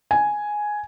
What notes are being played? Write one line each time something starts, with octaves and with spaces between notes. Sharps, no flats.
G#5